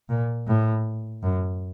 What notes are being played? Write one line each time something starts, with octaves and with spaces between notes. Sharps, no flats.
A#2
A2
F#2